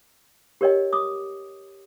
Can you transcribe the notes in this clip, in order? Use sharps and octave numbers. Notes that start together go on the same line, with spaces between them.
G4 A#4 C#5 D#5 G5
D6 D#6